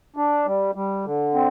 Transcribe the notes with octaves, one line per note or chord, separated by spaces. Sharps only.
D4
G3
G3
D3
C4